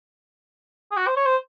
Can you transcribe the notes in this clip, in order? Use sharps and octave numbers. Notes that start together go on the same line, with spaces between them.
G#4
F#4
C5
C#5
C5